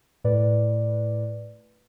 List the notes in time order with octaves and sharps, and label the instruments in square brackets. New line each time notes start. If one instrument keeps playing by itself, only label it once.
[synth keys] A2 B4 D5